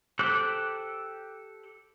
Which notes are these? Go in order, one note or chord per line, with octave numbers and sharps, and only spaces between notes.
G4 A4 C5 D6 F#6